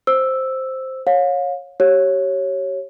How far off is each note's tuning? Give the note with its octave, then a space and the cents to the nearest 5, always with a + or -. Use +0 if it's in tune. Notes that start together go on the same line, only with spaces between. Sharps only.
C5 +0 E6 +0
C#5 -10 F5 +35
G4 -30 C#5 -10